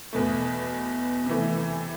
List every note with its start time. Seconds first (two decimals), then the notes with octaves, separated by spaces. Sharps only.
0.13 E2 B2 A3
1.26 C3 E3 A3